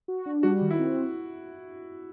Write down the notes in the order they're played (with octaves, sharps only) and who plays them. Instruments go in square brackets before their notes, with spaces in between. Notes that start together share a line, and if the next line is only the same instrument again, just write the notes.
[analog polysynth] F#4
D4
[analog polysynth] G3 [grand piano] F#4
[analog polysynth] D#3
[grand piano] E4
[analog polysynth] C4